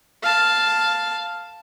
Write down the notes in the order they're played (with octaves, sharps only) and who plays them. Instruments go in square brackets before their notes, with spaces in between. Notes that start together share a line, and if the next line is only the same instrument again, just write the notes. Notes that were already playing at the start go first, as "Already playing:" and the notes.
[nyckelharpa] F5 A5